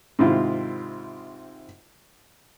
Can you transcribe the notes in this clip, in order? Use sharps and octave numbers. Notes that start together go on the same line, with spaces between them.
G#2 C3 D#3 C4 E4 F4